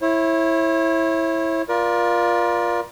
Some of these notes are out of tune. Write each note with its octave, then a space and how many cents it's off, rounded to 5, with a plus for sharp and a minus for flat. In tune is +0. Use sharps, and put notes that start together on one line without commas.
E4 +0 C#5 -35
F4 +0 A#4 +35 D5 +0